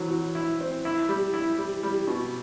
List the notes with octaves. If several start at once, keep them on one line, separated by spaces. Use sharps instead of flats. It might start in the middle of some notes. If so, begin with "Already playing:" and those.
Already playing: E3 F#3 C4
F#3
E4
C4
E4
G3
E4
G3
G3
B2